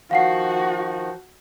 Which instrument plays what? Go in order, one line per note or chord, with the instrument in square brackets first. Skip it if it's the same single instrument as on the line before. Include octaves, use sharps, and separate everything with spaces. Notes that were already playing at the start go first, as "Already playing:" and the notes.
[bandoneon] D#3 F3 [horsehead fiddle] F#4 [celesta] F5 F#5 C7